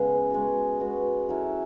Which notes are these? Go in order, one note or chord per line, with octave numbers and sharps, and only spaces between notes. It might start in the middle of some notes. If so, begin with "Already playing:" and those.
Already playing: C#3 G#3 B3
G#3 B3 F#4
G#3 B3 F#4
F#3 C#4 E4 A4